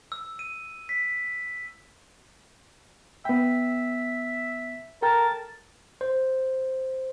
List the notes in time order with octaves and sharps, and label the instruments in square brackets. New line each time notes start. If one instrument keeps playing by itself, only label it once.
[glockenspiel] E6
D#7
B6
[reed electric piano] B3 G5 [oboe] E5
[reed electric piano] A4 G5 A#5 [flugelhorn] A#4 [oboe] A5
[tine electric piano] C5